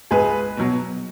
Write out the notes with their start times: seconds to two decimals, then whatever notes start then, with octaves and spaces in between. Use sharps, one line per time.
0.11 C#2 G#4 B4
0.57 B2 F#3